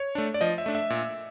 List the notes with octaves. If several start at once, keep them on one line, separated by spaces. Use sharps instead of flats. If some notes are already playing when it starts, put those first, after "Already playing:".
Already playing: C#5
A3 D4
D5
F3 D#5
E5
A3 D4
E5
A#2